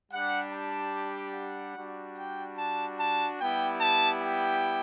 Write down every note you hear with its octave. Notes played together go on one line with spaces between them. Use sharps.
G3 D4 G4 F#5
A5
F#5
G3 D4 F#4
G5
A5
A5
G3 B3 E4 G4 G5
A5
G5